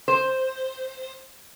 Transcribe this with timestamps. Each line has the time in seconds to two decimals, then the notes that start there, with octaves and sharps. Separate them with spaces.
0.08 C5